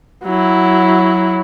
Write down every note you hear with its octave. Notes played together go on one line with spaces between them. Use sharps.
F#3 E4